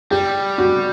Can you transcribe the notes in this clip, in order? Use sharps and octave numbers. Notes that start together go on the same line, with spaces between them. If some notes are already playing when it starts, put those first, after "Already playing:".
G3 G4
F#4